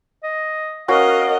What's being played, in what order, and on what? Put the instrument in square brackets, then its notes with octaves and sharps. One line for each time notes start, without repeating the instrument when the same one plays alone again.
[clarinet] D#5
[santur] C#4 F#4 [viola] A#4 D#5 [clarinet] F5